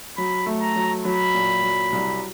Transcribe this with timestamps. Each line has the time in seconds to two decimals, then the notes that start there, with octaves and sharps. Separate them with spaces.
0.18 F#3 B5
0.46 A3
0.62 A#5
0.76 F#3
1.05 F#3 B5
1.34 A#2
1.63 F#3
1.92 C2